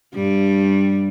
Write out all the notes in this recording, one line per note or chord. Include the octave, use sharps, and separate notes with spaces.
G2 G3